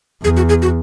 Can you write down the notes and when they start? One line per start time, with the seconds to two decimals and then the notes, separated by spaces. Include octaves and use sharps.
0.24 E2 G#4
0.37 F#4
0.49 G#4
0.62 F#4